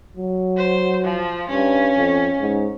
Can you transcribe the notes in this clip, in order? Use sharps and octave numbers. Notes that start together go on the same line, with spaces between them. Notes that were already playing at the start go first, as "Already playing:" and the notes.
F#3
C5
F3
G2 C#4
F2
G#2